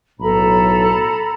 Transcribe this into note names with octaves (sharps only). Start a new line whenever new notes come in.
B1 A2 A4 A#5 B5